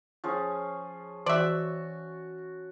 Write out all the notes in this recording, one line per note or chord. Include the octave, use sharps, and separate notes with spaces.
F3 C#4 G#4
E3 F#4 D5 E5 A5